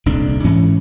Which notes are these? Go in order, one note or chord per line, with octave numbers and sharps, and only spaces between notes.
D#1 C2 D4
G#2 E3 C#4